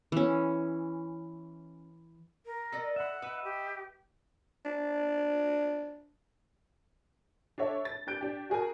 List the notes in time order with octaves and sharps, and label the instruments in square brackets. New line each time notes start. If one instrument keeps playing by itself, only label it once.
[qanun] E3 C#4
[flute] A#4
[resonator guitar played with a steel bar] A4 D5 D#5 [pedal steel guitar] A#5
[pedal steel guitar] E5 B5 [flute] F#5
[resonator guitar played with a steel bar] B4 [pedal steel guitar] D#5 E5 B5
[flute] G4
[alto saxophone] D4
[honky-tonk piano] D4 A4 C#5 E5
A6
D4 G4 G6 D7
D4 G4
F#4 G#4 A#4 G#5